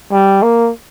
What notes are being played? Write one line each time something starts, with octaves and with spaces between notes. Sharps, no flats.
G3
A#3